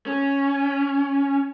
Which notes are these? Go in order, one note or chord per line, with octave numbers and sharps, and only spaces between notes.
C#4